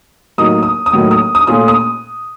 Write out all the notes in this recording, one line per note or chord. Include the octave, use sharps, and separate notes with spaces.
A2 F#3 A#3 D#4 D#6
D#6
D#6
A2 F#3 A#3 D#4
D#6
D#6
A#2 A3 C#4 F4 D#6
D#6